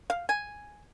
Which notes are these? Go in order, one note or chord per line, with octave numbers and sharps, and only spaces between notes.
F5
G#5